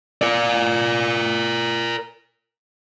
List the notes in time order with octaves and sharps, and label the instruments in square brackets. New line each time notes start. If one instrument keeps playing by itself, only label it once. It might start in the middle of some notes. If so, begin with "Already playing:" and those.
[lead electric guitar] A#4 D5